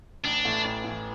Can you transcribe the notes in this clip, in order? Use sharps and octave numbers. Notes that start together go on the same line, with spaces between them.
A1 D4
A2 E3
A1
A2 E3